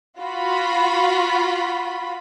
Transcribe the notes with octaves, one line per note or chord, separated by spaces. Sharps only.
F4 F#4 B5